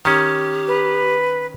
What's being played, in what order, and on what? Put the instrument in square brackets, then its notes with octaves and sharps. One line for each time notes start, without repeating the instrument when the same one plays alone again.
[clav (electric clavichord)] D#3 C#4 [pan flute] G4
[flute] B4